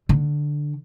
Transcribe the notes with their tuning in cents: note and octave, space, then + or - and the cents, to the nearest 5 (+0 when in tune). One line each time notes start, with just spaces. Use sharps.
D3 +5